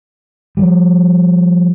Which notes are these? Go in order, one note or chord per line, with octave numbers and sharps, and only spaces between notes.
F3 G3